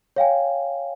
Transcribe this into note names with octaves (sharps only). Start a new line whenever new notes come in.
C#5 F5 G5 G#5